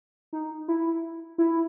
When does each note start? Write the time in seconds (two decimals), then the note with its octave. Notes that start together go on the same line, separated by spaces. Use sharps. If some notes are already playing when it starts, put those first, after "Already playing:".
0.33 D#4
0.68 E4
1.38 E4